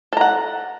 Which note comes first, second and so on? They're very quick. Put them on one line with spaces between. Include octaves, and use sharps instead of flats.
A4 A#5 F#5